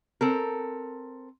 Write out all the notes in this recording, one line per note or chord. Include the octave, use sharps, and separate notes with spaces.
C4 A4 A#4